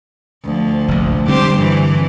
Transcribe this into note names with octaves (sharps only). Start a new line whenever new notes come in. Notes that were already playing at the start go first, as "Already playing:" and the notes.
D2 F3
F1 A#1
D3 G3 C4 G4 C5
G2 E3